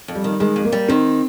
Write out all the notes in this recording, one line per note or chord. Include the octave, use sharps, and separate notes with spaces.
F2
G3
D#3
D#3 G#3
F2
A#3
G3
D#3 C4